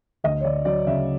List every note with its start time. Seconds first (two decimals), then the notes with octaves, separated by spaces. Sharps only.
0.24 D2 D#5
0.41 C#5
0.44 D2 D5
0.65 F#3 D5
0.87 C#3 E5